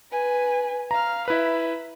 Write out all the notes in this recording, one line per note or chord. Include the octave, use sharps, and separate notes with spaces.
B4 G#5
F5 A#5 F6
E4 B4 E5 B5